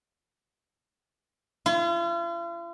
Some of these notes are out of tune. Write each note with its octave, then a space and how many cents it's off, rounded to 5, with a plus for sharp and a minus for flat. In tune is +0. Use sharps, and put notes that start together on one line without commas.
F4 -45